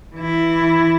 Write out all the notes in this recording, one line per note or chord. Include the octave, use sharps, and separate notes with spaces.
E3 E4